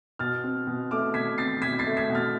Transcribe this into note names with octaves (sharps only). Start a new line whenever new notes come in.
B2 F6 A6
C4
B2
A3 D6 F6
B2 G#6 B6
C4 A6 C7
B2 G#6 B6
A6 C7
A3
G#6 B6
B2
F6 A6